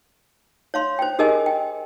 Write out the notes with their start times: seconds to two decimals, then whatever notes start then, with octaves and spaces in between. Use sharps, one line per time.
0.74 C#5 F5 C6
0.99 C5 G5
1.19 G4 G#4 A#4 D#5 G#5
1.46 G5